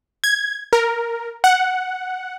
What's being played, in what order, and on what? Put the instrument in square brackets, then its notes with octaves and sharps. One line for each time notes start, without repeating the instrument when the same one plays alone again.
[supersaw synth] G#6
A#4
F#5